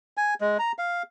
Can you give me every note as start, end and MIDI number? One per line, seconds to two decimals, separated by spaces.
0.17 0.34 80
0.41 0.58 56
0.59 0.72 82
0.78 1.03 77